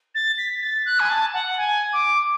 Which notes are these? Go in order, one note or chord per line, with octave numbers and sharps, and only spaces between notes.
A6
B6
A6
F#6
G#5
A5
F#5
G#5
D6